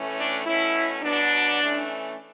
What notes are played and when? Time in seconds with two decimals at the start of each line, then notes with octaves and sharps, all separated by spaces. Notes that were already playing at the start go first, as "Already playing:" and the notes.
Already playing: A2 E3 A3 C#4
0.17 D4
0.45 B2 A3 C#4 E4
1.02 B2 F#3 B3 D4
1.59 E3 A3 C#4